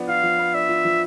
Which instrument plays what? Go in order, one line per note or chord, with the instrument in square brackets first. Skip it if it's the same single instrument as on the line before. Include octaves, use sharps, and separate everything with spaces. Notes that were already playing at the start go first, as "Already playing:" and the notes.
Already playing: [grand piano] F3 B3 D4
[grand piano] F4 [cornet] F5
[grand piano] F3
B3
[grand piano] D4 [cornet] E5
[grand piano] F4
F3